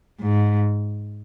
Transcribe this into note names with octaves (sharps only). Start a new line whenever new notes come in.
G#2